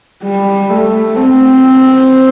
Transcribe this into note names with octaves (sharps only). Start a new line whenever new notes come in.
G3
A3
C4